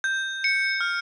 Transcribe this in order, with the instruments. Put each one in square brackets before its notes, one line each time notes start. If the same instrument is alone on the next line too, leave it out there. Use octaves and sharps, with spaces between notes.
[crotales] G6
C#7
F6